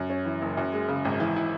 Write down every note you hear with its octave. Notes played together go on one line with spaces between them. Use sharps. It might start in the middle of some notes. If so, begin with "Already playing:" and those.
Already playing: F#2
C#4
E3
F#1
F#2
G#3
C#3
G#1
E3
E4